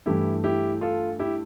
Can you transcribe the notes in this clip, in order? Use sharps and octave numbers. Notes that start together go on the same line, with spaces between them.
G2 E3 A3 E4 G4
E4 G4
F4 A4
E4 G4